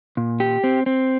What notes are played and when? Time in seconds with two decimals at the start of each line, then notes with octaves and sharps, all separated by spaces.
0.17 A#2
0.40 G4
0.64 C4
0.86 C4